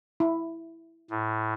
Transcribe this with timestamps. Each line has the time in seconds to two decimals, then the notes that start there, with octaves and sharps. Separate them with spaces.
0.20 E4
1.10 A2